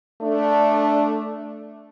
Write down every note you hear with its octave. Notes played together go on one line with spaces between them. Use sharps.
A3 D4